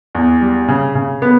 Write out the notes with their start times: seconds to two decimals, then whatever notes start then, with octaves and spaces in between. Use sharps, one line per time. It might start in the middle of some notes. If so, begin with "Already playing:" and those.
0.15 E2
0.41 G3
0.68 C#3
0.95 C#3
1.22 B3